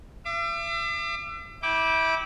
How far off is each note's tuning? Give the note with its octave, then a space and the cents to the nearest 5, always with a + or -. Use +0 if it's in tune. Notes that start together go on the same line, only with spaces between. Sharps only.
E5 +40 D6 +30
E4 -25 G5 +0 D6 +0